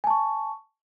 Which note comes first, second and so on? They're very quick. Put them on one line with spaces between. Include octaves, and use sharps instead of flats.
G#5 A5 C#6